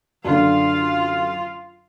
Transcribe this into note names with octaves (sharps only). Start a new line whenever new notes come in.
F#2 D3 F4 F5